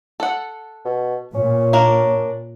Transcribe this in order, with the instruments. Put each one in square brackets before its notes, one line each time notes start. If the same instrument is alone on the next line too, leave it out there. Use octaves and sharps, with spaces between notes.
[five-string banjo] A4 F#5
[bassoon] B2
[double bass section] A#2 [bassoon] C#4
[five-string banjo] A#3 D4 A#4